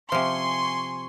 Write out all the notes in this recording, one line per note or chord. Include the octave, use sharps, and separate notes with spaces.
C3 F3 G#5 C6 C#6